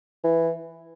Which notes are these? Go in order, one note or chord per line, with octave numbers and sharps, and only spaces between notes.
E3